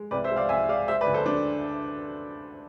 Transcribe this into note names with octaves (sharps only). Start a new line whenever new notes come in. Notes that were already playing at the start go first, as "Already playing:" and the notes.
Already playing: G#3
C2 B4 D5
C5 E5
G#3
D5 F5
C2 E5 G#5
G#3 D5 F5
G#3 C5 E5
B4 D5
D2
A4 C5
D4